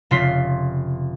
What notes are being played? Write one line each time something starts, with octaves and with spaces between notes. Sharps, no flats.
F1 C#3 F4 C6 B6 C7